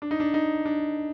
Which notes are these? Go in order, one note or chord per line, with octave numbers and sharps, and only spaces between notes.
D4
D#4
D4
D#4
D4